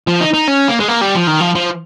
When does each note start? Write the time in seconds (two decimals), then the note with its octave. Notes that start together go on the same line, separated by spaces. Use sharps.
0.08 F3
0.21 D#4
0.34 D#4
0.48 C#4
0.68 A#3
0.80 G#3
0.88 A#3
1.01 G3
1.15 F3
1.27 D#3
1.41 F3
1.55 F3